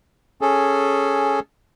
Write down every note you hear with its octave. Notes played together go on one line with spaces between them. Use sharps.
C#4 G#4 A4